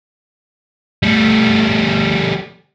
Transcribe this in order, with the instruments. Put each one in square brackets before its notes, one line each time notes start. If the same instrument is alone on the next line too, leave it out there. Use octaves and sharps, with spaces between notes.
[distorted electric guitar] G3 A3